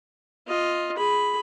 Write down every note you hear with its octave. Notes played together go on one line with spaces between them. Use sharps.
F4 D#5
G#4 B5